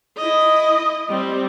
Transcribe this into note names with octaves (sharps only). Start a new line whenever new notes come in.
E4 D#5
G3 C4